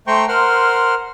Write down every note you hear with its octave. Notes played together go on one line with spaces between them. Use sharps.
A3 C5 G5 A#5 C6 C#6
A#4 C5 F#5 C6 F6